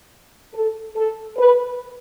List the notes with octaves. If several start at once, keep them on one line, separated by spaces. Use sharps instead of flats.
A4
A4
B4